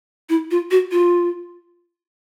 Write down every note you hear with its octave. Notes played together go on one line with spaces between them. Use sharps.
E4
F4
F#4
F4